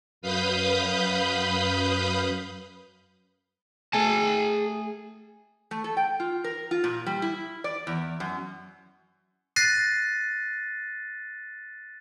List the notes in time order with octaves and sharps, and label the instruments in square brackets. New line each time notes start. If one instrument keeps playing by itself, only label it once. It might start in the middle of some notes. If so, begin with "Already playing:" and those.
[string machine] F#2 B4 F5 B5 D#6 G6
[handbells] A3 G#5 [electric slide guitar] G#4 A5
[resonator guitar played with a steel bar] A3
A4
G5
F4
A#4
F4
A#2
G3
E4
D5
E2
F#2
[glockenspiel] F#6 A6 A#6 C7 D#7